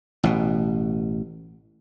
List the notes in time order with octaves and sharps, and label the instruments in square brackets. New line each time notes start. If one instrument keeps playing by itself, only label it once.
[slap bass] A1 B2